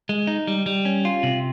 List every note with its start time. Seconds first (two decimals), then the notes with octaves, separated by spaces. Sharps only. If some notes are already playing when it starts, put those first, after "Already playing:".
0.09 G#3
0.27 D#4
0.47 G3
0.66 G3
0.85 C#4
1.05 F4
1.23 C3